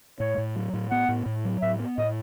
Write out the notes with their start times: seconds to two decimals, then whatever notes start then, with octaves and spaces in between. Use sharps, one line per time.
0.19 A2 C#5
0.38 A2
0.56 F#3
0.73 A2
0.91 B3 F#5
1.09 A2
1.26 A2
1.45 F#3
1.62 A2 E5
1.79 B3
1.98 A2 D#5